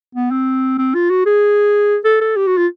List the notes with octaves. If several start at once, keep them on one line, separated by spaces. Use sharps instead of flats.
B3
C4
C4
F4
F#4
G#4
A4
A4
G4
F#4
F4